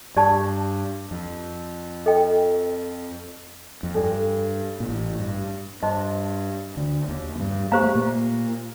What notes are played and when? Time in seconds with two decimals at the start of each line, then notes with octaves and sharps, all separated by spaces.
0.16 G2 G4 D5 A5
1.11 F2
2.06 A4 D#5 G5
3.83 F2
3.94 G2 D4 A4 D5 G5
4.80 A#2
4.88 A1 A2
5.20 G2
5.83 G2 F4 C5 D#5 A5 C6
6.76 D2 D3
7.08 D#2 D#3
7.40 G2 G3
7.72 A#3 G4 C5 F5 A#5
7.83 A3
7.95 A#2 A#3